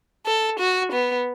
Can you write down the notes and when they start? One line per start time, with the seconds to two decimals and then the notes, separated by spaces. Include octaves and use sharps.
0.26 A4
0.59 F#4
0.92 B3